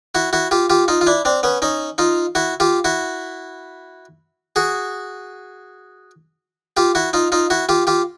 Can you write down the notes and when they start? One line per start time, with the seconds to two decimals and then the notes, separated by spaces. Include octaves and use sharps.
0.15 E4 F#4
0.33 E4 F#4
0.51 F4 G4
0.70 F4 G4
0.88 D#4 F4
1.01 F4
1.07 D4 E4
1.25 C4 D4
1.43 B3 C#4
1.62 C#4 D#4
1.98 D#4 F4
2.35 E4 F#4
2.60 F4 G4
2.85 E4 F#4
4.56 F#4 G#4
6.77 F4 G4
6.95 E4 F#4
7.13 D#4 F4
7.32 D#4 F4
7.50 E4 F#4
7.69 F4 G4
7.87 F4 G4